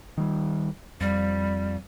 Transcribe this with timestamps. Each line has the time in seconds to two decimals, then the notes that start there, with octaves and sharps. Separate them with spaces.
0.18 D#3 G3
1.01 F2 G3